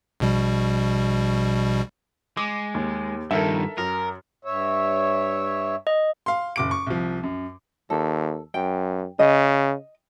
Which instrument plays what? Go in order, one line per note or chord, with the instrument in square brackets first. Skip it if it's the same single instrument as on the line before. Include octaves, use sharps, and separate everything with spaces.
[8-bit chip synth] A#1 B2 G3
[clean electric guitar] G#3 [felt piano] D6
[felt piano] D#2
[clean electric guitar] G2 D#3 [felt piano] A4 A#4 E5
[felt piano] F#2 [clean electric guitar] A#4
[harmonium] G2 C#5 E5
[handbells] D#5
[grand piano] F5 C6
F#1 D6 D7
C#6
C2 F3
F#2
[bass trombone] D#2 [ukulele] A4
[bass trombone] F#2 [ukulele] G5
[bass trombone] C#3 [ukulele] D#5